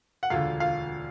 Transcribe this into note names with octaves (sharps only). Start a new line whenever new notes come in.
F#5
E1 D2 D3 F4 F5
F4 F5